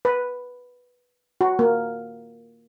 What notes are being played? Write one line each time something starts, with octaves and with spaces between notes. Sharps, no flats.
B4
F#4
A#3